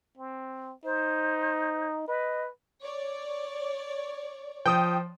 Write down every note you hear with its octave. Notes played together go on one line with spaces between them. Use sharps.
C4
D#4 C5
B4 D#5
C#5 D5
F3 G5 D#6